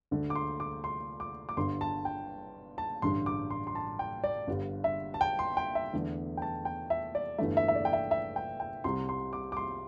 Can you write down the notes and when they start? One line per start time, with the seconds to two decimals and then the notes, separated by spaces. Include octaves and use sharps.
0.11 D2 D3 A3
0.30 D6
0.35 C6
0.60 D6
0.84 C6
1.20 D6
1.49 D6
1.57 G1 G2 D3 C6
1.81 A5
2.05 G5
2.78 A5
3.02 A1 G2 D3 C6
3.26 D6
3.50 C6
3.67 C6
3.75 A5
3.99 G5
4.24 D5
4.47 G1 G2 D3 G3
4.84 E5
5.14 A5
5.21 G5
5.39 C6
5.57 G5
5.75 E5
5.93 E2 D3 A3
6.37 G5
6.42 A5
6.65 G5
6.90 E5
7.15 D5
7.38 G1 G2 E3 A3 E5
7.57 E5
7.68 E5
7.75 D5
7.85 G5
7.93 E5
8.11 E5
8.36 G5
8.60 G5
8.84 C2 C3 G3 C6
9.09 C6
9.33 D6
9.52 D6
9.57 C6